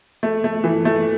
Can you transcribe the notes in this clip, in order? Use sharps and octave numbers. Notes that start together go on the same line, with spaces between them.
A3
A3
E3
A3